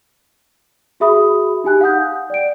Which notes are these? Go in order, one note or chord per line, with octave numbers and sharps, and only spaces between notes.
F#4 G#4 E5 B5 D#6
D#4 G4 G#5 F#6
F5 F#5 D#6 G6
D5 G5 D7